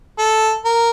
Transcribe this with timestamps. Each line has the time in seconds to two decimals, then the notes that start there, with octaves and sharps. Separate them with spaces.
0.19 A4
0.65 A#4